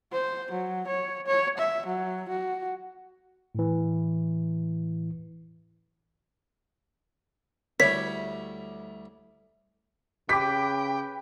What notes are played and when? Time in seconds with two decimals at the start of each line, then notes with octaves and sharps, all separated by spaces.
0.12 C5
0.52 F#3
0.87 C#5
1.27 C#5
1.58 E5
1.87 F#3
2.29 F#4
3.55 A2 E3
7.80 D2 G3 E4 C#5 B6
10.29 C#3 G4 B4 G5 D6 B6